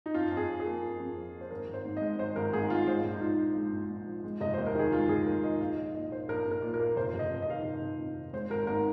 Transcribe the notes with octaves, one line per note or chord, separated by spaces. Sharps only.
D#4
F2 F4
F2
G#4
F3
G#4
A#3
F2
F2
F3
A#3
C5
G#1 A#4
G#1
C5
G#2
G#3 D#5
G#1 C5
G#1 A#4
G#2 G#4
G#3 F4
G#3 C5
A#1
D#4
G#2 F4
F3
G#3
A#1
G#2
F3
G#3
F1 D#5
D#2 C5
A#4
D#3 G#4
G#3 F4
F1 G#4
D#2 A#4
D#3 D#5
A#1 F5
A#1 D#5
A#2 D#5
A#3 C5
A#1 A#4
A#1
A#4
A#2
A#4
A#3
F1 C5
F1 D#5
F2
D#5
D#3 F5
D#5
F1
F1
F2
D#3
G#3 C5
G#1 A#4
G#2 A#4